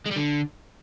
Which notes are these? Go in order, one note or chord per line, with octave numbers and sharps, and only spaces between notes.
G#3
G3
D3